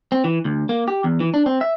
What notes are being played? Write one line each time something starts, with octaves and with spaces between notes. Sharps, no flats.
C4
E3
D2
A#3
G4
E2
E3
D4
C4
E5